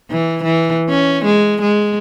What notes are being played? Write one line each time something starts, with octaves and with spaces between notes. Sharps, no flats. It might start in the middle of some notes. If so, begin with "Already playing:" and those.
E3
E3
C#4
G#3
G#3